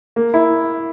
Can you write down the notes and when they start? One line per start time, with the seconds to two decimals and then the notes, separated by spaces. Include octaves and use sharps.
0.16 A#3
0.34 E4